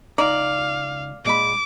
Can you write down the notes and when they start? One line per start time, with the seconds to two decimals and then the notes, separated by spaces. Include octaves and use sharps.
0.18 C#2 D#4 D5 F5 A#5
1.25 A#2 G#3 B5 D6